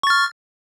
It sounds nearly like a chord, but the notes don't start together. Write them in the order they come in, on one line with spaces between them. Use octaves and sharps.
C#6 A6 F6